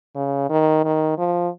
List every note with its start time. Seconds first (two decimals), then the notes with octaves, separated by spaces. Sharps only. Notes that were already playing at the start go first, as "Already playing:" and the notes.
0.15 C#3
0.49 D#3
0.84 D#3
1.18 F3